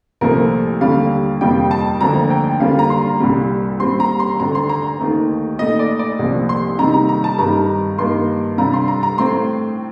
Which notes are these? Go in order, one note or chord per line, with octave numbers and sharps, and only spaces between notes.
C2 A#2 F3 A3 A#4
D#2 D3 G3 F5
F2 C3 G3 A#3 F4 G5
A5
D2 D3 F3 A#3 A#5
G5
D3 G3 A#3 F4 F5
A#5
C6
C2 A#2 G3
A#2 G3 C4 C6
A#5
C6
D2 D3 A3 A#5
C6
A#5
D#2 D#3 A3 D#4
A#2 A3 D#4 D#5
D5
D5
C2 A#2 F3
C6
C3 D#3 G3 A#3 D#4 A#5
A#5
A#5
A5
G2 D#3 G3 A#5
G2 D#3 A#3 C6
C3 G3 D4 F4 A#5
C6
A#5
A#5
A2 A3 C4 C6